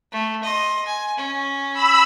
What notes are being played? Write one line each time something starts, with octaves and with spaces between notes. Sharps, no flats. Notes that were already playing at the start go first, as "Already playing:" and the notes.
A3
D#5 C6
G#5
C#4
B5 E6